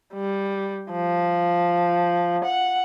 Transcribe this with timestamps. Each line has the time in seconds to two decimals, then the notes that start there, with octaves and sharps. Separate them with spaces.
0.13 G3
0.92 F3
2.44 F#5